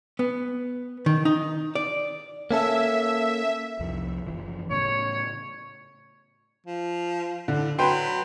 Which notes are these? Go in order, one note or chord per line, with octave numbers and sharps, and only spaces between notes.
B3
D#3
D#4
D5
A#3 C#4 A4 E5
C2 F2 F3
F#1 E3 F3
A2 C#3 C#5
F3
A2 D3
F#3 B4 G5 C6